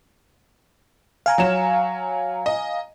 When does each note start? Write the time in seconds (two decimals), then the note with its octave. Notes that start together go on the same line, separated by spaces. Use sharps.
1.26 F5 G#5 A#5
1.38 F#3 C#5 E7
2.46 D#5